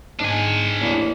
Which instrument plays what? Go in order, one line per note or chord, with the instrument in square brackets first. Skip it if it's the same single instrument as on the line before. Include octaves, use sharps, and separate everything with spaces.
[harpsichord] G#2 [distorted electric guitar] D4 G#5
[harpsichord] A1 E2 A#3